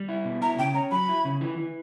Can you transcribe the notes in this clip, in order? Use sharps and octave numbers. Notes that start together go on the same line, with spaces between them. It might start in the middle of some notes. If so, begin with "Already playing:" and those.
Already playing: G3
E4
B2
E4 A#5
C#3 G5
C#4 A#5
F#3 B5
E4
C#3
E3
E3